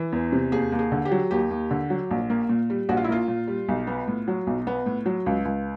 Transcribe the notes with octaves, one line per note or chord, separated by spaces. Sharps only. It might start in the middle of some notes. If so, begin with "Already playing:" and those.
Already playing: E3
E2
C3
D#2 G#4
D#2
G#4
D3
G4
F#3
D#2 G4
D#2
D3
F#3
A#1
A#3
A#2
G3
A#1 F#4
F4
E4
A#3 F4
A#2
G3
B1
B3
A2
F#3
B1
B3
A2
F#3
C#2
C#2